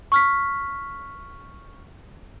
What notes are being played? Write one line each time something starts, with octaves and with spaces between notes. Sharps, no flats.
C#6 F6 B6